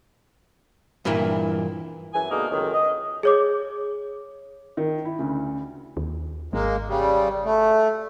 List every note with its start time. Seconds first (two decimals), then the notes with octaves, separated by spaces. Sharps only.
1.05 G2 A#2 E3 A#3 E4
2.14 F#2 E3 G#5
2.31 B2 D3 G#3 A#3 D#4
2.51 C#2 F#2 A2 D#3
2.73 D#5
3.23 G#4 C#5 D6
4.77 D#3
5.05 E4
5.19 D2 C#3
5.97 D#2
6.53 G#1 G#3 A#3
6.88 C#3 G3
7.45 A3